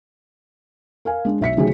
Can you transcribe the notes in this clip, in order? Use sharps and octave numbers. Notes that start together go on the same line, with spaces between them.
A#4 F5 G#5
G#3 D4
B1 E5 B6 C#7
C3 D#3 F#3 A3 G#4